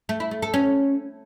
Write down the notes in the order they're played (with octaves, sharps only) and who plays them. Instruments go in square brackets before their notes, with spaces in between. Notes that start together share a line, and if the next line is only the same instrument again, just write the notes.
[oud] A3
E4
A3
A4
C#4